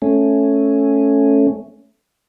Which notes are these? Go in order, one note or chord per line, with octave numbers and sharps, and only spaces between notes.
A3 C#4